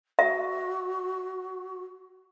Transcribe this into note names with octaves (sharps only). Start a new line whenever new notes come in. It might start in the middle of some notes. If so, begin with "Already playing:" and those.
F#4 E5